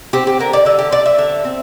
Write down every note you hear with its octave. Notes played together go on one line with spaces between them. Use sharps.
C4 G4
G4
D3 A#4
D5
D3 E5
G4
C4 D5
E5
D3 E5
C4